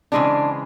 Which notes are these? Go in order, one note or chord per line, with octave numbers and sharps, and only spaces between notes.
C#3 E3 G#3 C4 D4